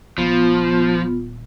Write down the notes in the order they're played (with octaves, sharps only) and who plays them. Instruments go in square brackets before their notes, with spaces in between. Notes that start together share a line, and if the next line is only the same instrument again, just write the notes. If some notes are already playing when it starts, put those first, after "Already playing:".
[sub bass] D#1 [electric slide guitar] F3 [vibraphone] B3 F4